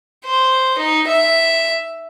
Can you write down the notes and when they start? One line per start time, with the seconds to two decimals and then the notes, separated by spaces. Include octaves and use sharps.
0.25 C5
0.78 D#4
1.07 E5